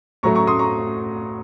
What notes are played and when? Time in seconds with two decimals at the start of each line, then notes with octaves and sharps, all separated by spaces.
0.23 A2 F#3 A3 A#5 C#6
0.35 A#5 C#6
0.47 C6 D#6
0.59 A#5 C#6